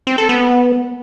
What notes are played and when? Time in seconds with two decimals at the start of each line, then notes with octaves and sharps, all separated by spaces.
0.07 C4
0.18 A4
0.29 B3